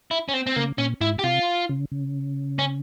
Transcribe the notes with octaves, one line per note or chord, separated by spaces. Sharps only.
E4
C#4
C4
C4
C#3 A#3
A#2 C#4
G#2 E4
G4
C3 F4
C#3
C#3
C#4